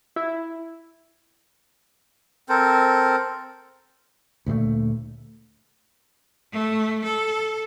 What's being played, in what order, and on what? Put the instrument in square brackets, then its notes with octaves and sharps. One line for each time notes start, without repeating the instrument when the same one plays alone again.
[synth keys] E4
[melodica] C4 A4 A#4 C5
[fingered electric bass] D2 A#2 G#3 A3
[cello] A3
A4